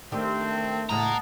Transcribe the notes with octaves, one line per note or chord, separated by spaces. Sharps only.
D#3 A3 C4 D4 G4
E2 A2 C#3 A#3 D#5 F#5 A5 A#5